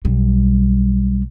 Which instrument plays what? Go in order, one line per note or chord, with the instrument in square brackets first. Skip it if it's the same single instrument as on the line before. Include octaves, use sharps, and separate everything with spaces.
[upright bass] B1 G3